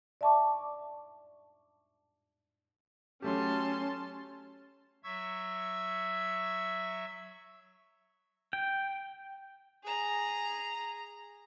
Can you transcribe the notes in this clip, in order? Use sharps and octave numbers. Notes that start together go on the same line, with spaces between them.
D5 E5 A5 C#6 D6
F#3 A3 C#4 G4 A5 C6
F#3 E5 C#6 E6 G#6
G5
G#4 A#5